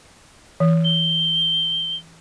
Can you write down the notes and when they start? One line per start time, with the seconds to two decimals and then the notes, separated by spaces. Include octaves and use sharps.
0.60 E3
0.85 G7